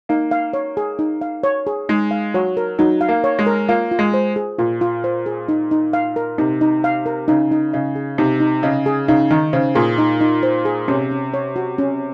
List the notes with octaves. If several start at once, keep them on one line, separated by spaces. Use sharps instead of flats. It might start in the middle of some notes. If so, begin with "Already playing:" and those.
A#3 D#4
F5
C#5
G#4
D#4
F5
C#5
G#4
G#3 D#4
F5
F#3 C#5
A#4
F#3 D#4
F5
A#3
C#5
G#3
A#4
A#3 F4
F4
G#3
C5
G#4
A#2 F4
F4
C5
G#4
D#4
D#4
F5
A#4
C3 D#4
D#4
F5
A#4
C#3 D#4
D#4
C#3 D#5
G#4
C3 D#4
D#4
C#3 D#5
G#4
C#3 D#4
D#3 D#4
C#3 C5
A#2 G#4
D#4
D#4
C5
G#4
C3 C#4
C#4
C#5
F#4
C#4